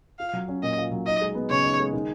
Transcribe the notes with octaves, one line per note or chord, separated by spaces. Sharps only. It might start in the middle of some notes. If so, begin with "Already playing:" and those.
F4 F5
F#3
C#4
A#2 D#5
F4
F#3
D#4 D#5
G#3
B3
C#3 C#5
D#4
G#3
D#3